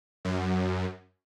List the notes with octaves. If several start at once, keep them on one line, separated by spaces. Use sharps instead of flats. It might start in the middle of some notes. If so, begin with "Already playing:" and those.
F#2